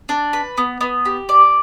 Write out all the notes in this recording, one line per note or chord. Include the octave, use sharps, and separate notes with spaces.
D4
B4
B3
B3
G4
D5